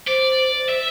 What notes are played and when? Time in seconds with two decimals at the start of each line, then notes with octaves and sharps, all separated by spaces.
0.07 C5 D5
0.57 C5
0.69 E5